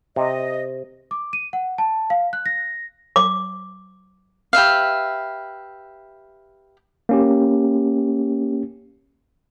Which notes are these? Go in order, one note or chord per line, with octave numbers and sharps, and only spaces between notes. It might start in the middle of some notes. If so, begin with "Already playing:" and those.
C3 D#5
D6
D#7
F#5
A5
F5
F#6
A#6
D6
G4 B4 E5 F5
A#3 C#4 G4